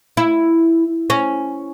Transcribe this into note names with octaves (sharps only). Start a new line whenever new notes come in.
E4
C#4